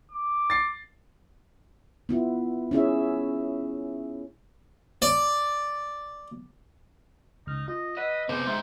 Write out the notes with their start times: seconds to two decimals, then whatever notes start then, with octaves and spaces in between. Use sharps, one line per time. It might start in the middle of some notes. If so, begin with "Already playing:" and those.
0.11 D6
0.50 A6 C7
2.09 B3 E4 F4
2.71 C#4 E4 G#4 E5
5.02 D5
7.47 C#2 D#4 F6
7.68 F4 D#5
7.97 B4 D#5 F#5 E6
8.29 C3 B3 C4 G4 G#4 B4 C5 F5
8.47 G#2 C4 D#4 E5